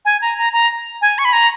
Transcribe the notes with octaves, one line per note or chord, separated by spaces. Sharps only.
G#5
A#5
A#5
A#5
G#5
C#6
B5
A#5